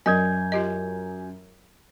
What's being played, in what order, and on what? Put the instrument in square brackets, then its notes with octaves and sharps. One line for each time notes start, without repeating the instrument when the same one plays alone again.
[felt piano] F#2 [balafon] F#3 D#5 [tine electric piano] G#5 G6 G#6
[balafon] F4 G4 D#5